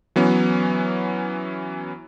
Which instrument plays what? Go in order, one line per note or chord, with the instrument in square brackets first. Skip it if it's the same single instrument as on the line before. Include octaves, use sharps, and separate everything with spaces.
[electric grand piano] E3 F#3 B3 C#4